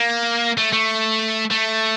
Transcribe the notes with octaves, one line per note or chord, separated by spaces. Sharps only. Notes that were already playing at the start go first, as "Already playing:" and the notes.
Already playing: A#3
A3
A3
A3